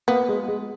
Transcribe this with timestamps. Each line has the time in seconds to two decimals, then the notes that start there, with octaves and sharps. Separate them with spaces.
0.08 A#3 B3
0.28 G#3
0.48 G#3